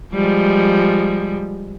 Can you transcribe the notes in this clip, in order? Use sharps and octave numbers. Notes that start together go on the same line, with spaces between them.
F3 G3 G#3